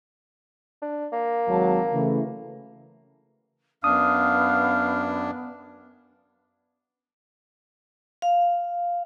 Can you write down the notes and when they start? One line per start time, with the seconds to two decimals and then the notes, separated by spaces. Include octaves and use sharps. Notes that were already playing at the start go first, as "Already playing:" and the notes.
0.82 D4
1.12 A#3
1.48 G#1 F#3 A5
1.93 C#3 E3 A3
3.84 F#2 B3 D4 F5 D#6
8.22 F5